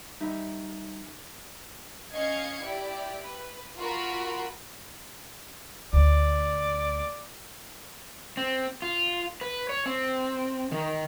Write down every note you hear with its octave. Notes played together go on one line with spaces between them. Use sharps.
G3 D#4 E5
C#4 D#5 F5 G#6 C#7
E4 G4 D5
B4
F4 F#4 A#4 B5
D2 D5
C4
F4
B4
C#5
C4
D#3